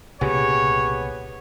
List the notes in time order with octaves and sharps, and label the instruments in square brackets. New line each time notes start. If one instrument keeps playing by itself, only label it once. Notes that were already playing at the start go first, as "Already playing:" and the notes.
[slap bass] C2 A#2 C#3 [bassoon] B3 [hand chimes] G4 G#4 G#5 [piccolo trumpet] C#5